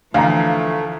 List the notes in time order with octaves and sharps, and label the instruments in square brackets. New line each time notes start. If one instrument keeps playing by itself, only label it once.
[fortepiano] D2 [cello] E3 F3 [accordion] A3 [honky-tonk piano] F5 A#5